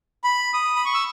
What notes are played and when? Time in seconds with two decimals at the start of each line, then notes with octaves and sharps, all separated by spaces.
0.24 B5
0.54 D#6
0.76 B5
0.85 C#6
0.94 E6